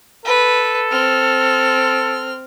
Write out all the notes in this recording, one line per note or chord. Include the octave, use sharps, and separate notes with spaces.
A4 B4
C4 F6